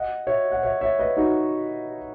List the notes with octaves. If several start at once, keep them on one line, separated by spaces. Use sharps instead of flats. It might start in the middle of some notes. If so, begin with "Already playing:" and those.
Already playing: D#5 F#5
C#5 E5
F#5
C#5 E5
C#5 E5
B4 D#5
D#4 F#4